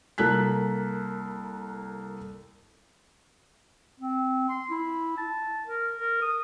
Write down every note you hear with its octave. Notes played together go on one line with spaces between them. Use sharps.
C2 A#3 A4 F#6 B6
C4
C6
E4
A5
A#4
A#4
D#6